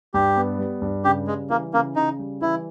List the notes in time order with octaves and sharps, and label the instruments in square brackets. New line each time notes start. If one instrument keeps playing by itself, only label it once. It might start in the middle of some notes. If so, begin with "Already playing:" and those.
[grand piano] G2 [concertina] G4
[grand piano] B3
G3
G2
[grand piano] C#3 [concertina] G4
[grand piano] G3 [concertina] G#3
[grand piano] E3 [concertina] A#3
[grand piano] C#3 [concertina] A#3
[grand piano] C#3 [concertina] D#4
[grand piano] G3
[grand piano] E3 [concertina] E4